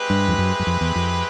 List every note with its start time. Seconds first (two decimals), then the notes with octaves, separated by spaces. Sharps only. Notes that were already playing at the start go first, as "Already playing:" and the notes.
Already playing: G#3 C4 E4 G4 B4
0.10 G2
0.28 F2
0.38 F#2
0.59 F#2
0.67 F2
0.81 E2
0.95 F2